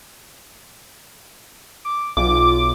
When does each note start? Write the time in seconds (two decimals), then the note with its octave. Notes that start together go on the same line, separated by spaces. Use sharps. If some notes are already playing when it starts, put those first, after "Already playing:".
1.85 D6
2.17 B1 F4 D6